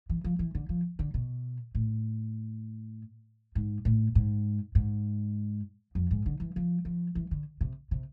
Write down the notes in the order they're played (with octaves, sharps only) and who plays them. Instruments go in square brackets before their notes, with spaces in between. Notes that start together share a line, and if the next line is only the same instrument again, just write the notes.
[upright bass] E3
F3
E3
D3
F3
D3
B2
A2
G#2
A2
G#2
G#2
F2
G#2
D3
E3
F3
F3
E3
D3
C3
C3